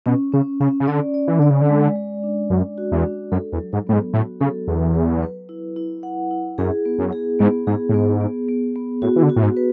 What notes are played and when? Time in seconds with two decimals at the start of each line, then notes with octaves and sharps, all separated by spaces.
0.06 B2 C#4
0.32 C#3 C#4
0.60 C#3 C#4
0.80 C#3
0.88 D3 D5
1.14 D5
1.28 E3
1.39 D3 D5
1.50 C#3
1.61 D3
1.69 G#3
1.96 G#3
2.23 D4
2.50 F#2 G#3
2.78 F#4
2.92 E2
3.05 D4
3.32 F#2 A4
3.52 E2
3.59 F#3
3.73 G#2
3.87 A2 B3
3.93 G#2
4.14 A2 F#4
4.41 C#3 A4
4.67 E2 F#3
4.95 B4
5.23 B4
5.49 E4
5.76 E4
6.03 F#5
6.31 E4
6.58 F#2 G#4
6.85 B3
6.99 F#2
7.13 G#4
7.39 G#2 B3
7.67 G#2 G#4
7.89 A2
7.94 G#2 B3
8.21 B3
8.48 B3
8.76 B3
9.02 A2 F#4
9.16 E3
9.23 D3
9.30 F#4
9.36 A2
9.43 G#2
9.57 B4